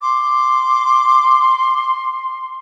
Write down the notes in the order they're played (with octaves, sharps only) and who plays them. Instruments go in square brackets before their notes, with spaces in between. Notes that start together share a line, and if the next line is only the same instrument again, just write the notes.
[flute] C6 [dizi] D6